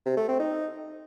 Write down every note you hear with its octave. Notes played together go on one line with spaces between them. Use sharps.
C3
A3
C4
D#4